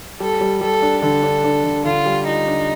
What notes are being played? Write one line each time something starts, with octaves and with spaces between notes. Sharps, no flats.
G3 A4
G3
G3 A4
D4
D3 A4
D4
D4
D3
D3 F4
G3
D#4 F4
D4